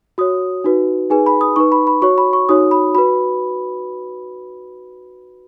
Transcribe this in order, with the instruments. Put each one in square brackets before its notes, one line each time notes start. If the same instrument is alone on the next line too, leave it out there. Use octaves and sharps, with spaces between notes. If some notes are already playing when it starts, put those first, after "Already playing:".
[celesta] F#4 C#5 D#6
D#4 F#4 B4
D#4 G#4 B4 G#5
B5
D#6
D#4 B4 C#6
B5
B5
F#4 C#5 C#6
B5
C#6
D#4 F#4 C#5 D#6
B5
F#4 B4 B5